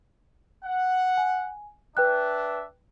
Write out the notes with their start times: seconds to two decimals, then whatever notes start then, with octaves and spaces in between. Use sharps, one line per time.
0.65 F#5
1.17 G#5
1.97 D4 B4 E5 G5 F#6